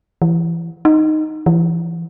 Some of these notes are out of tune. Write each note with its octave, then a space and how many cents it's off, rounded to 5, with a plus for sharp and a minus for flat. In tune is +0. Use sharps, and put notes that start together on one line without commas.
E3 +25
D#4 -5
E3 +30